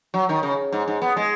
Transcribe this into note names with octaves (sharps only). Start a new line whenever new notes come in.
F#3
D#3
C#3
G#2
G#2
B3
G#3